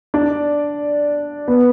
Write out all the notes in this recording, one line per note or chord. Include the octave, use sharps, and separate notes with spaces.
D4 D5
B3 B4